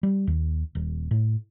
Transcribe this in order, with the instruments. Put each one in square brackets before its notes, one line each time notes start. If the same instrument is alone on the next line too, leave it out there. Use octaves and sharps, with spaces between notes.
[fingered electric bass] G3
D#2
D#1
A2